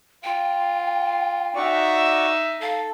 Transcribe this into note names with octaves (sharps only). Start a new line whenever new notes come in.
F4 G5
D#4 F#4 D5 E5 C#6
A4 F5